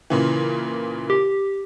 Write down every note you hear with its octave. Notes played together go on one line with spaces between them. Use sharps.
A#2 C#3 E3
G4